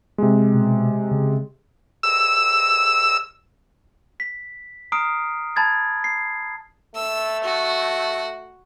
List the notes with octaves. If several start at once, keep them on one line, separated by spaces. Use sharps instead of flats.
C3 G#3
B2
C#3
E6
B6
A#5 D#6 F6 C7 D7
A5 B5 G#6 A6
C7
A3 E6
F#4